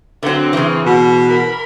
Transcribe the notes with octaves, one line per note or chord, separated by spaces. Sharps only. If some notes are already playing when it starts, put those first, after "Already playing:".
D3 F#3 C4
C#3 E3
B2 F#4
A#4 B5